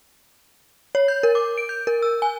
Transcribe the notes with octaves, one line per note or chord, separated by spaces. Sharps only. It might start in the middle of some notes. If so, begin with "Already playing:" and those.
C#5
G6
A#4
D6
D7
G6
A#4
E6
G#5